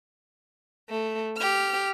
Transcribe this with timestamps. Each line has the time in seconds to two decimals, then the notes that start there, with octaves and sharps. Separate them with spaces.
0.90 A3
1.37 G4 F6